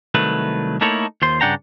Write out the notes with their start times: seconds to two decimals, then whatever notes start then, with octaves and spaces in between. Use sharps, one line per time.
0.15 C2 D#3 F#3 A3 B4
0.81 A3 A#3 D#4 E4 A4 C#5
1.22 D#2 F4 C5 C6
1.41 G2 C#3 D4 F#5 G5 A#5